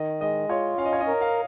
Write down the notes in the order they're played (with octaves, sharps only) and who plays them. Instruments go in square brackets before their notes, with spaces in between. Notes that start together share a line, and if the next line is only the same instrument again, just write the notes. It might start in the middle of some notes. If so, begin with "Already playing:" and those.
Already playing: [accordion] D#3 [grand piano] D#5
[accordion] G#3 [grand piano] D#5
[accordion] F4 [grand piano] C#5
[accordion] C#4 [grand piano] F5
[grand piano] D#5
C#5
D#5
[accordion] A#4
[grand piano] F5